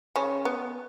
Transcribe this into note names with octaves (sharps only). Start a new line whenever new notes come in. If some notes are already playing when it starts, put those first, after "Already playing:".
C#3 C#4
B3